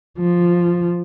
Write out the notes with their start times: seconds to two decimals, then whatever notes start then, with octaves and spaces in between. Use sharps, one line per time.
0.19 F3